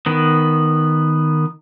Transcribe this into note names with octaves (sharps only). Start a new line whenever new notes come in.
D#3 B3